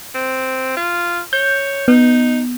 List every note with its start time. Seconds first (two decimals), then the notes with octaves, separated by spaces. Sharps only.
0.15 C4
0.77 F4
1.33 C#5 G6
1.88 B3 D#4